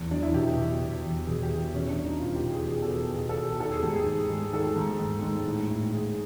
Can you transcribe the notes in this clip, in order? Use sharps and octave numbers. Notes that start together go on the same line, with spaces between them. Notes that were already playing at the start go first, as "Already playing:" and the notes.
Already playing: E2
F#3 D4
E4
B2 G4
B2
B2
E2
B2 G#4
G4
E2
B2 C#4
D4
G3
D#4
B2 F4
G4
B2
G#4
B2 G#4
A4
B2
B2 G#4
A4
B2
G4
D#3 A4
G#4
G#2 G4
G#4
G#2
G#3
D#3 A4
G#2
G#2
G#2
A2
A2
A2 G#4